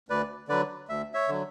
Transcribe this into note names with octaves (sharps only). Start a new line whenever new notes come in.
D2 B4 D5
D3 F#3 B4 D5
D2 E5
C#5 E5
D3 F#3